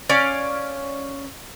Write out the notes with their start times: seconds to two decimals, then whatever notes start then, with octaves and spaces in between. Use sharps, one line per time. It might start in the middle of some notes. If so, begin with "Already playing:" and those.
0.09 C#4 D5 F5 G#5